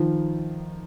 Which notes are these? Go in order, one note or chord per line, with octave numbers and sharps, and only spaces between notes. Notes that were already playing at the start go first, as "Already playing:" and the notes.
Already playing: D#3 F3